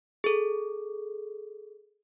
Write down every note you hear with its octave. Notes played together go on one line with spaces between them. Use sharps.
G#4 A4